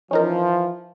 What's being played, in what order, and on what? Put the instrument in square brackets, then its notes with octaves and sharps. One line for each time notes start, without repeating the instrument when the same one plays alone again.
[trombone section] E3 F3 [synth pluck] C#4 D#4 A#4